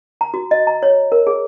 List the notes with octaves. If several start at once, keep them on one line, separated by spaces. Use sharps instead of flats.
A#5
F#4
D#5
A#5
C#5
A#4
G#4